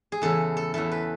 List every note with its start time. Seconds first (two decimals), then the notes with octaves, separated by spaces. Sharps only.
0.12 G#4
0.22 E2 C#3 E3 A4
0.57 A4
0.74 E2 C#3 E3 A4
0.91 B4